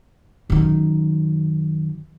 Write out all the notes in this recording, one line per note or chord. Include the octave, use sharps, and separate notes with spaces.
F#2 D#3